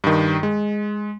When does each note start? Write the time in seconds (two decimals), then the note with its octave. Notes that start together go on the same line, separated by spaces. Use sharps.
0.04 G2 D#3
0.43 G#3